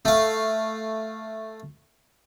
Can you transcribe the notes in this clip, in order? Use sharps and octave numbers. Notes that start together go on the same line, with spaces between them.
A3 F5